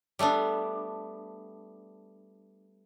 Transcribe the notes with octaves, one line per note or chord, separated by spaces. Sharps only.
G3 A3 B3 D4